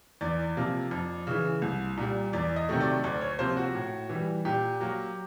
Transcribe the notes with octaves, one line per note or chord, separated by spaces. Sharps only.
E2 D5
C3 F3 A#3
F2
C#3 E3
C2
A#2 G3
E2 D5
D#5
C3 D#3 F#3 A3
D5
D2 D5
C#5
C3 F3 A#3 C5
F#4
A2
E3
G3
A#2 G4
F#3 A#3